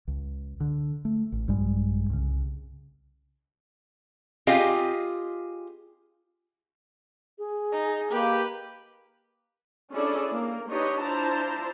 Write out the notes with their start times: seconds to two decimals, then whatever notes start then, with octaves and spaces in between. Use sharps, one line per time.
0.08 C#2
0.60 D3
1.05 A3
1.32 A1
1.48 A#1 G2 G3 G#3
2.10 C2 C#3
4.47 C4 F4 G4 G#4 D#5 F5
7.38 G#4
7.72 D#4
8.12 A#3 G4 B4
9.92 C#4 D4 E4 G#4 A4 D5
10.34 A#3
10.70 D4 D#4 G4 B4 C#5 D#5
11.00 D4 E4 F4 C5 A5 A#5